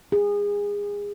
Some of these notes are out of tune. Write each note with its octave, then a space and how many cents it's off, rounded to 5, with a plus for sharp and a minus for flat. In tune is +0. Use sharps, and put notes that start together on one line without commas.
G#4 -25